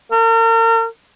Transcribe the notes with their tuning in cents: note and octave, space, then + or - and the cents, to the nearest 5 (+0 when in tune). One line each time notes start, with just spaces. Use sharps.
A#4 -40